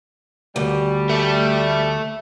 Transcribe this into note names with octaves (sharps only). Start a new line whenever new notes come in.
D2 G3
A4 E5